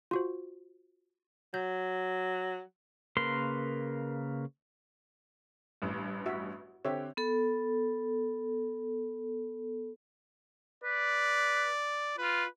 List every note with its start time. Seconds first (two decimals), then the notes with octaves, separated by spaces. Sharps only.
0.11 F4 F#4 C5
1.54 F#3 G6
3.17 C#3 A#3 A#4 B4 C6
5.82 A1 G2
6.26 F#4 E5
6.85 D3 C4 G4 C#5 E5
7.17 B3 A4
10.84 B4 D5
12.18 F4 B4